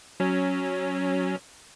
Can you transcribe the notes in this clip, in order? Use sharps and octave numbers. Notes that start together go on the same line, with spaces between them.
F#3 C#4